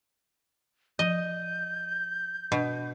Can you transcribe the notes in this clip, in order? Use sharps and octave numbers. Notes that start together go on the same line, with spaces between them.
F3 D#5 G6
B2 D4